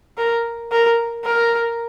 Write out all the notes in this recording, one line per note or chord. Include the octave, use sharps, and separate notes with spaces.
A#4
A#4
A#4